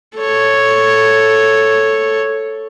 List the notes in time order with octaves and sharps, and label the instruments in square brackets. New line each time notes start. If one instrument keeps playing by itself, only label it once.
[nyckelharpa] A4 C#5